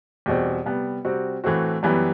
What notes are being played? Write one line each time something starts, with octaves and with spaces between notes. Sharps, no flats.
E2 B2 G3 C4
C3 G3 B3
C3 G3 C4 F#4
A2 E3 A3 C4 F#4
F#2 E3 G3 B3